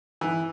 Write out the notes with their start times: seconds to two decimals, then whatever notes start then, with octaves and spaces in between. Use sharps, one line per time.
0.21 E3